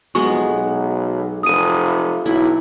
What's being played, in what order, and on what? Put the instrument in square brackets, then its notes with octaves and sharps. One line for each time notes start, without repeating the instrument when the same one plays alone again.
[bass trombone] F1 [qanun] F#3 G#3 B3 [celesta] C#6
[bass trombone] B1
[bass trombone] F1 [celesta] D#6 D#7
[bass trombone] B1 [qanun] E4